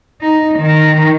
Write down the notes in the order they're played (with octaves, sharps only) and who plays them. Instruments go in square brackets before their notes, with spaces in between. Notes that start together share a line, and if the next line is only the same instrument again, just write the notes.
[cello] D#4
D#3